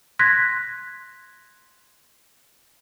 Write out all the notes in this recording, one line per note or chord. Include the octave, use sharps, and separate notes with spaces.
C6 F#6 G#6 A#6 B6